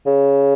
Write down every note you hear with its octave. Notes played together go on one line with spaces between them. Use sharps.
C#3